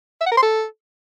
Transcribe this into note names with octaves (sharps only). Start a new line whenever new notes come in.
E5
F#5
A#4
C6
A4